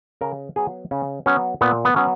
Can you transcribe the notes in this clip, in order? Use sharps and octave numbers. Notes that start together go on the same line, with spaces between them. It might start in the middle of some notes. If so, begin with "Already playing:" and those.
C#3 A#4
F#3 B3 G#4
C#3 C#4
F#3 B3 C#4
A#2 B3
B3
F#3 B3 C#4